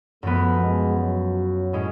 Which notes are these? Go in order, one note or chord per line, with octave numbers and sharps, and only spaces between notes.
F#2 F3 A3 B3
G#3
F#3
A2 G#3 C#4